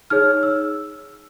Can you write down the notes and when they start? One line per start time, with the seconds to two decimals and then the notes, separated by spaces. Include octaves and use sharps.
0.10 D#4 G#4 C#5 F6
0.43 E6